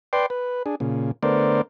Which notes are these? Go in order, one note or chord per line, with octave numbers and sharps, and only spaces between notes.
B4 D5 G5 C6
B4
D4 G#4
A#2 C#3
D3 A3 B3 A#4 C5 D5